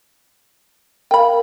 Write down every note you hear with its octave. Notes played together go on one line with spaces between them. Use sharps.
A#4 F5 G5 B5